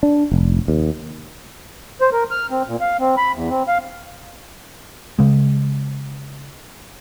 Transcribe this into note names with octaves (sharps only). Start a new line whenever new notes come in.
D4
F1
D#2
C5
A#4
F6
C4
A#2
F5
C4
B5
E2
C4
F5
C#3 G#3